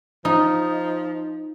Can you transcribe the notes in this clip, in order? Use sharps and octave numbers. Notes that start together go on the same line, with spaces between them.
F3 D#4